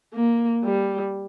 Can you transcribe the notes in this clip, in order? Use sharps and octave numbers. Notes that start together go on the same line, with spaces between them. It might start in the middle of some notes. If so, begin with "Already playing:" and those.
A#3
G3